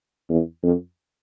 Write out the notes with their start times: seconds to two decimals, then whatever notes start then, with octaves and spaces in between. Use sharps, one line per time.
0.29 E2
0.63 F2